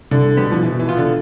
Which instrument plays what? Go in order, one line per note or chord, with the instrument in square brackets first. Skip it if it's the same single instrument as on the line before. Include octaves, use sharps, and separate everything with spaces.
[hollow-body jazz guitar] C2 [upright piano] D3
[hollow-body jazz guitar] B2 G3 B3
[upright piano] F3
[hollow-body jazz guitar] B2 [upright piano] E3
[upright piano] E3
[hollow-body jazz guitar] B3 F4
[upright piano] D3